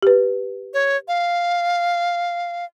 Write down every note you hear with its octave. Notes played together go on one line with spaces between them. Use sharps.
G4 B4
C#5
F5